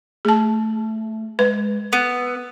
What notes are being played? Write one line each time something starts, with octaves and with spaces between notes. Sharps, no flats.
A3 G#4 A5
G#3 B4
B3 E6